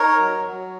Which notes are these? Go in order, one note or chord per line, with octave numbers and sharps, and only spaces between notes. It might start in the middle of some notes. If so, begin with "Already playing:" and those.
Already playing: D#4 A#4 C#5
F#3
F#3